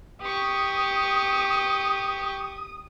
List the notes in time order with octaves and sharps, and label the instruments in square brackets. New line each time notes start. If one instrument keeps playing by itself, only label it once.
[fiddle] G4 C#6 [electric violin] D#6